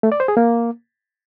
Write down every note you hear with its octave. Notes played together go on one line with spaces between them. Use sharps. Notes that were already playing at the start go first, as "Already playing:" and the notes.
A3
D5
C5
G#4
A#3